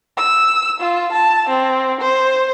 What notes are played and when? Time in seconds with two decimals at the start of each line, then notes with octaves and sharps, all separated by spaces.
0.17 E6
0.80 F4
1.12 A5
1.49 C4
2.01 C5